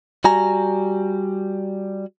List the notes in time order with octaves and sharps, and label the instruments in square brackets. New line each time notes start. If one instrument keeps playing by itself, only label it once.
[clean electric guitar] G3 F#4 G#5 A#5